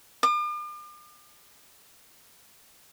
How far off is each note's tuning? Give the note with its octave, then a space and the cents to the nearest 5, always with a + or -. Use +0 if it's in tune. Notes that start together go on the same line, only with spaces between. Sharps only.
D6 +45